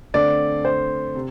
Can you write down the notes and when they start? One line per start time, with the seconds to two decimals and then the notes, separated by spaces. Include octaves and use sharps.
0.14 D3 A3 C4 D5
0.65 C5
1.15 C3